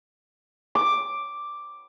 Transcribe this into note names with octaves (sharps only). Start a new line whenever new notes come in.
D6